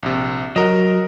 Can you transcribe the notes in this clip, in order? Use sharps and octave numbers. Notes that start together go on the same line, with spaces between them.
A#1 C3
F#3 F#4 A#4 D#5